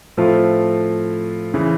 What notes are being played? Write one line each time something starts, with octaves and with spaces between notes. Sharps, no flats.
A2 F3 A3 C4 F4
C#3 E3